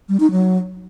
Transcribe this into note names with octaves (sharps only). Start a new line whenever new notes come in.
G3
D#4
F#3